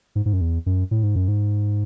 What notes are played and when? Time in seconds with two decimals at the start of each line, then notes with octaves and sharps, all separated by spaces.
0.15 G#2
0.26 G#2
0.33 F#2
0.41 E2
0.66 F#2
0.91 A2
1.03 G#2
1.16 F#2
1.28 G#2